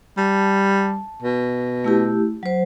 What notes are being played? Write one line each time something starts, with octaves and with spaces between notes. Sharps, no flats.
G3 A5
B2
A3 E4 G4
F#3 C5